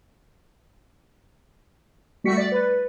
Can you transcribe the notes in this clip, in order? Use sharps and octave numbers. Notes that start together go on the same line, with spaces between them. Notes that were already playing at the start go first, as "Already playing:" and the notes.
G3 A3 F#4 B6 C#7
D5 A6
B4